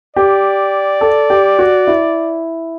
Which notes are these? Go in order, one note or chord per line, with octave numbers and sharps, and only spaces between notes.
G4 D5
A4
G4
F#4
E4